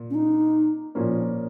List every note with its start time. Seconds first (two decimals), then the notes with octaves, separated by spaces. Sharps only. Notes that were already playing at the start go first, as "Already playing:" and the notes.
Already playing: A#2
0.10 C#4
0.15 D#4
0.95 A#2 F3 A#3 C#4